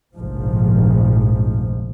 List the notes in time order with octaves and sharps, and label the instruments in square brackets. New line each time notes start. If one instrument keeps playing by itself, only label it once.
[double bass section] F1 A#1 G#2 F3